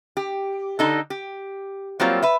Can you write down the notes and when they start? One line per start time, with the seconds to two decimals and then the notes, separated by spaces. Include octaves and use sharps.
0.17 G4
0.79 D3 D#4 A4
1.10 G4
2.00 F#3 G3 A#3 C4 F4 C#5
2.23 B4 E5